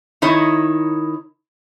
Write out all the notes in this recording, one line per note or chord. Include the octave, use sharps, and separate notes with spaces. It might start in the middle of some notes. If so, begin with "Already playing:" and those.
D#3 D#4 E4 C#5